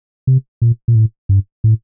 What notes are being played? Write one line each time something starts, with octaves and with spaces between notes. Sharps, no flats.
C3
A#2
A#2
A2
G2
A2